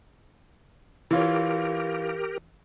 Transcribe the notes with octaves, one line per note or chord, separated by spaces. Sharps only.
E3 F4 G4 A#4 C#5